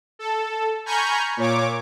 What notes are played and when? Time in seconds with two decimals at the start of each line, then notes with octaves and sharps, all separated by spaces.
0.19 A4
0.86 G#5 A#5 B5 C#6 F6 G6
1.37 A#2 C#5 D6